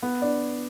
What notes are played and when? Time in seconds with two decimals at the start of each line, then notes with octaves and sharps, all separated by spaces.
0.03 B3
0.22 D4